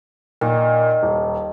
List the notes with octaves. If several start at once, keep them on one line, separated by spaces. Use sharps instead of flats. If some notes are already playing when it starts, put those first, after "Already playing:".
A#2 D#3
D#1